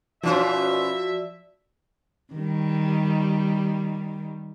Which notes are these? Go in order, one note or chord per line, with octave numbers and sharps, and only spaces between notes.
B2 F3 C#4 F#4 C5 D5 E5
D#3 G3